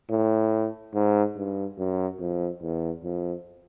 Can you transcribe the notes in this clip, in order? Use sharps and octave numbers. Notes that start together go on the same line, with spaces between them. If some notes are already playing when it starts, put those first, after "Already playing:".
A2
G#2
G2
F#2
F2
E2
F2